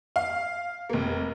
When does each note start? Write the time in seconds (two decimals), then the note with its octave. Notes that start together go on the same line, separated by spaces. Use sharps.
0.16 F5
0.90 F1 A#3